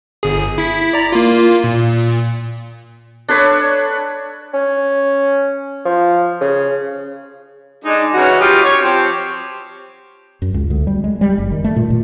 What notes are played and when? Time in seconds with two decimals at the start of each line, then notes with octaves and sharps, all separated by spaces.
0.23 G1 G#4
0.58 E4 B6
0.93 D5 A#5
1.12 A#3 F4
1.64 A#2
3.28 D4 A4 B4 C#5
4.53 C#4
5.85 F3
6.41 C#3
7.85 G#3 D4 D#4
8.14 C#3 E3 C#4 F#4
8.40 G3 D#4 F4 G4
8.63 C#5
8.80 F3 C4 G4 C5
10.42 F#2
10.54 C#2
10.70 D2
10.87 G3
11.04 G#3
11.21 G3
11.38 F#1
11.51 D#3
11.64 A3
11.76 A#2
11.90 A#2